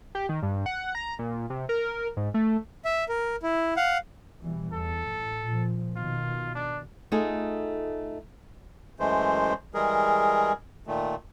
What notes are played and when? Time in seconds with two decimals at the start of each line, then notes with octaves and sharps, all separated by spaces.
0.15 G4
0.29 D#3
0.43 G2
0.66 F#5
0.95 A#5
1.19 A#2
1.50 C3
1.69 A#4
2.17 G#2
2.34 A3
2.85 E5
3.09 A#4
3.43 E4
3.77 F5 F#5
4.42 B2 E3 G3
4.73 E2 A4
5.10 A2
5.47 A#2 F3
5.97 B2 D#3 F4
6.55 D4
7.12 A3 D#4 F4 G#4
9.00 F#2 E3 G#3 A3 C5
9.74 E3 G3 G#3 G#4 A#4
10.87 A#2 D#3 A3